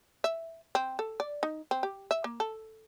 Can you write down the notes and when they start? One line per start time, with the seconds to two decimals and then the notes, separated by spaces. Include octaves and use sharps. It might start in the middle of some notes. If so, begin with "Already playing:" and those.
0.24 E5
0.75 C4
0.99 A4
1.20 D5
1.43 D#4
1.71 C4
1.83 G4
2.11 E5
2.24 A#3
2.40 A4